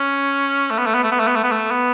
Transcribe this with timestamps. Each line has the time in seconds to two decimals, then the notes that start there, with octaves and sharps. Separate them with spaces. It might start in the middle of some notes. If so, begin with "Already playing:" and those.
Already playing: C#4
0.71 A3
0.79 B3
0.87 A3
0.95 B3
1.04 A3
1.12 B3
1.20 A3
1.27 B3
1.36 A3
1.44 B3
1.52 A3
1.71 B3